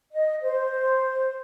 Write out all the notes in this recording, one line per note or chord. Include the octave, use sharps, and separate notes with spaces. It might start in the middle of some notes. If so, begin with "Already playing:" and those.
D#5
C5